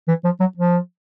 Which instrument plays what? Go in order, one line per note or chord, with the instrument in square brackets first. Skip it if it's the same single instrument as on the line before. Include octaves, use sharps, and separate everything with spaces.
[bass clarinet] E3
F3
F#3
F3